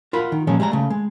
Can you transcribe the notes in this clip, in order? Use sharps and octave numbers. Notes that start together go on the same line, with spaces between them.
F4 A#4 F#5 B5
D#3
A#2 F3 G#3 C#4
G3 G#3 F5 A#5
C#3 A3
G#3